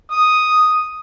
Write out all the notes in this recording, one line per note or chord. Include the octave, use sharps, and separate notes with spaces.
D#6